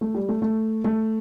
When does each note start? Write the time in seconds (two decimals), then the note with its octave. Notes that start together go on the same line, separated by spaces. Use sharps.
0.01 A3
0.14 G3
0.29 A3
0.42 A3
0.84 A3